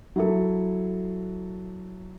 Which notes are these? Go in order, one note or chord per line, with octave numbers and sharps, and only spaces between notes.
F#3 E4 A4